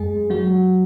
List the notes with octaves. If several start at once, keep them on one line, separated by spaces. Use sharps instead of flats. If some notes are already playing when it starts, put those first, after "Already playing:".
Already playing: F#2 G#3 G#4
F#3 F#4